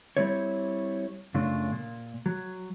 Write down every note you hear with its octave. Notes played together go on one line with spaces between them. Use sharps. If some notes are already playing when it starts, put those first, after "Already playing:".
G3 C4 E4 C#5
F#2 C#3 A3 D4 F4
A#2
F#3